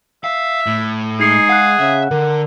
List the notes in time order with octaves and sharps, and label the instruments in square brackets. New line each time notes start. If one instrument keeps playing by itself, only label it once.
[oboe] E5 [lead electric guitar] F5
[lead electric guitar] A2
[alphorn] G#3 [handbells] D#4 C7 C#7 [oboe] G#4
[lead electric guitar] F5 [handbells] F#5 F#6
[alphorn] C#3 [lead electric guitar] E5
[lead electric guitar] D3 [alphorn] A#4